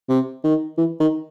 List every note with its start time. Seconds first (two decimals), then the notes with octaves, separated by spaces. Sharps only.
0.09 C3
0.44 D#3
0.77 E3
1.00 D#3